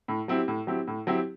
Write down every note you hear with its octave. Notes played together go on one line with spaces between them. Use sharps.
A2
F#3 C4 E4 G4
A2
F#3 C4 E4 G4
A2
F#3 C4 E4 G4